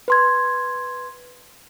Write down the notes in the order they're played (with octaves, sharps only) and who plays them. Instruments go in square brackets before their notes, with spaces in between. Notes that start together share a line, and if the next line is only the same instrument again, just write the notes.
[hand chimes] B4 C6 G#6